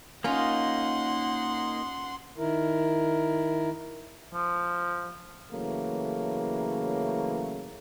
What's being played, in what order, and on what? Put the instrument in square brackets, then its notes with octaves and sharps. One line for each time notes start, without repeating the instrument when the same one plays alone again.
[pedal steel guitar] A#3 D#4 [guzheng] C#4 F4 [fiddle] F#5 C6
[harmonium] D#3 E4 A#4
[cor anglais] F3
[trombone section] C#3 E3 F#3 A3 A#3